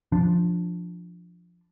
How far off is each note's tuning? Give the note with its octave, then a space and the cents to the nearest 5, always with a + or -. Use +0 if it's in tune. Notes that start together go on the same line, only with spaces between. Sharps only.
F3 +0 D4 +0